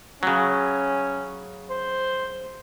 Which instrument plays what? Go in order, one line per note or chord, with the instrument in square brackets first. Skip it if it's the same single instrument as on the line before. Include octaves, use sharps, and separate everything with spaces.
[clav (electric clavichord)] C#3 F#3 [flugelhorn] C#4
[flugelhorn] C5